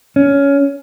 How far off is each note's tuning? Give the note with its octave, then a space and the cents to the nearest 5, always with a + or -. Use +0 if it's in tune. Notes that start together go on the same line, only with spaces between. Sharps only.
C#4 +15